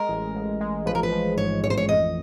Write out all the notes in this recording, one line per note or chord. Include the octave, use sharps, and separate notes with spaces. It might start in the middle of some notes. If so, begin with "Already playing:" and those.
Already playing: G#3 A#4
A1
A1
G#3
F3 B4
A#4
B4
F3
G#2 C#5
A1 C#5
C5
C#5
F2 D#5